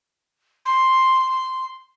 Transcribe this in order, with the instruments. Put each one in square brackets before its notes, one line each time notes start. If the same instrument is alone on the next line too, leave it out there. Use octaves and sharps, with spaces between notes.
[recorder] C6